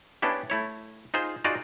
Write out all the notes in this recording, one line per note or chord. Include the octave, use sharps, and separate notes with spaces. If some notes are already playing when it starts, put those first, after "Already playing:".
B3 C#4 D4 E4 G4
A3 E4 C#5
D#4 F4 G#4 C5
D#4 F4 F#4 G#4 D5 D#5